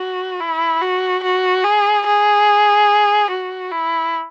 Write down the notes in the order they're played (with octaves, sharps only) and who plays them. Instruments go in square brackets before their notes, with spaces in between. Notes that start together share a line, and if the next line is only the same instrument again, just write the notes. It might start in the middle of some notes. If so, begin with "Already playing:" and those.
Already playing: [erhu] F#4
E4
F#4
F#4
G#4
G#4
F#4
E4